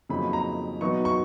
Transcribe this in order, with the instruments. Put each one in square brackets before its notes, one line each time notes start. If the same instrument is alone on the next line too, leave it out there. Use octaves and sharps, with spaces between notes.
[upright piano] F2 C#3 F#3 A#3 D#4 B5
A#5
B2 F#3 B3 D#4 C#6
C#6